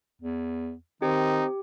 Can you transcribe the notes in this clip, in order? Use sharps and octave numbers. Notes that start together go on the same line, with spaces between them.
E2
D#3 C4 D#4 G4